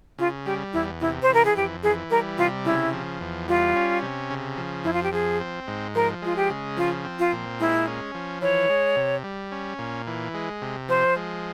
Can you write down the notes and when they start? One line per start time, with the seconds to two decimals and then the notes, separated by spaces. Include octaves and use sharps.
0.18 C#3 F4
0.46 G3 G4
0.73 E2 E4
1.01 C3 E4
1.22 C5
1.29 E3 A#4
1.45 G#4
1.56 F2 G4
1.83 E3 G#4
2.11 G3 A#4
2.38 C3 F4
2.65 C#3 E4
2.93 F3
3.20 E2
3.48 G3 F4
3.76 C#4
4.02 C3
4.30 C#3
4.58 F3
4.84 F2 E4
4.93 F4
5.03 G4
5.13 F3 G#4
5.41 C4
5.67 G#2
5.95 F3 A#4
6.22 G#3 F4
6.36 G4
6.50 C#3
6.77 F3 F4
7.05 C4
7.19 F4
7.32 A#2
7.60 G#3 E4
7.87 C#4
8.14 F3
8.42 E3 C#5
8.69 G#3
8.96 C3
9.24 G3
9.52 C#4
9.78 A#2
10.07 E3
10.34 G#3
10.62 C3
10.89 F3 C5
11.16 G#3